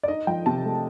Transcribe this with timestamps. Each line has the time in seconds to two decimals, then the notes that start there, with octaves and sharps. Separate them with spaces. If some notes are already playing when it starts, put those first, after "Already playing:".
0.03 D5
0.08 D#4 D#5
0.27 F3 G5
0.46 C3 A5
0.65 A3